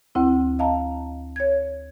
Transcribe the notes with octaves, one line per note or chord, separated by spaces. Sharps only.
D2 C4 E4
D#5 F5 A5 A#5
C#5 G#6